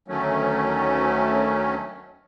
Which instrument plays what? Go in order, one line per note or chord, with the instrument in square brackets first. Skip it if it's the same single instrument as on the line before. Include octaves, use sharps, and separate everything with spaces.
[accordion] D2 D#3 F#3 A3 C#4